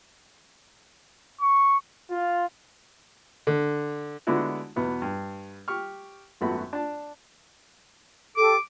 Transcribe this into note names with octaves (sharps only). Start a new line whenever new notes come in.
C#6
F4
D3
D3 G#3 B3 D4 E4 F#4
E2 B2 B3 E4
G2
G4 C#6 F6
G#1 F#2 A3 B3 F#4 B5
D4 A5
G4 A4 D6